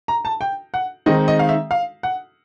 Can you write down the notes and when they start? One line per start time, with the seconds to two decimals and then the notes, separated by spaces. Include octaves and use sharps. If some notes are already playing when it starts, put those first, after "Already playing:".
0.08 A#5
0.25 A5
0.41 G5
0.74 F#5
1.06 D#3 G#3 C4 D#4 D#5
1.28 D#5
1.39 F5
1.49 E5
1.71 F5
2.03 F#5